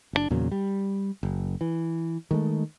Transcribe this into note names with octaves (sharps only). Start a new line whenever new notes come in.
F#1 C3 D4
E2 A#2 C#3 F#3
G3
F#1
E3
D#3 G#3 A3